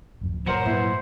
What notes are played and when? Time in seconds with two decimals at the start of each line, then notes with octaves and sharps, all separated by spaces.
0.21 D1 F#2 F3
0.46 A#2 F#3 A#4 C5 C#5 F#5 C#7
0.66 G#2 A#3 E4 B4